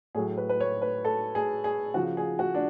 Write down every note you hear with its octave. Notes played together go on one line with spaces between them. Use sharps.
A2 F#3 G#4
B4
B4
C#5
B4
A4
G#4
G#4
C#3 F3 F#4
G#4
F#4
D4